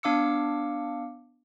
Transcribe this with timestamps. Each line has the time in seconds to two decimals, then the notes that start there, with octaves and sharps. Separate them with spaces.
0.03 B3 D4 F5 D6 E6 C#7